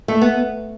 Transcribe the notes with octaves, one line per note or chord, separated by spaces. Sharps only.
A3
B3